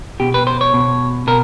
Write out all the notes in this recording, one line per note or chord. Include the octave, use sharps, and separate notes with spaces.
B2 G4
B4
C5
C#5
B2
B2 A#4